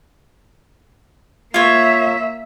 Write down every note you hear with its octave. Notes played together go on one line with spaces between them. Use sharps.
A#3 F4 C#5 E5